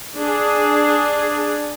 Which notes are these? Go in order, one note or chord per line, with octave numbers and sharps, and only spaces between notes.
D4 G#4